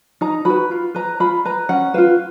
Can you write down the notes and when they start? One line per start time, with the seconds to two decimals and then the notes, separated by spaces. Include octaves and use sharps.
0.21 D#4 A#5
0.45 F#4 B4 B5
0.71 F4
0.95 B4 A#5
1.20 F4 B5
1.45 B4 A#5
1.69 C#4 F#5
1.94 F4 B4 F5